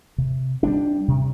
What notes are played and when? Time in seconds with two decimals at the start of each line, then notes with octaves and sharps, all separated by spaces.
0.18 C3
0.63 G3 B3 D4
1.08 C3